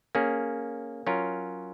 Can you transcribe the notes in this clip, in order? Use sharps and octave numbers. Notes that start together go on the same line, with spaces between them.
A#3 C#4 G#4
F#3 C#4 F4 A#4